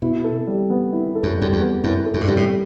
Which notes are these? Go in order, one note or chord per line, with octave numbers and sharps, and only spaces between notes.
B2 E4
A4
G3
B3
E4
A4
F#2
F#2 G3
E2
B3
F#2 E4
A4
F#2
G2
F#2 G3
A2